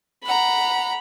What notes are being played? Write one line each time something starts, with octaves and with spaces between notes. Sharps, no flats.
F#5 A#5 B5